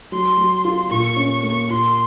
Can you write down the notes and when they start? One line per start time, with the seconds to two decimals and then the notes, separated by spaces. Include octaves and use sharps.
0.12 F#3 C6
0.37 F#3
0.65 F4
0.90 A#2 C#6
1.16 C#4
1.43 A#3
1.69 A#2 C6